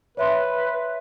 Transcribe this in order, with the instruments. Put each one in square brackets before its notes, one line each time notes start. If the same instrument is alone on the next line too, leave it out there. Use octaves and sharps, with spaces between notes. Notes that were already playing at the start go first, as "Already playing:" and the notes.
[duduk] B4 [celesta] C#5 E5 C6